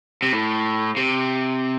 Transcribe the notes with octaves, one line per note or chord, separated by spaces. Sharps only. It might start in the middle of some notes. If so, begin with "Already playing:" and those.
C3
A2
C3